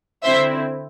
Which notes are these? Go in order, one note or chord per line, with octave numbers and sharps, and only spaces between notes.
D3 C4 E4 C5 E5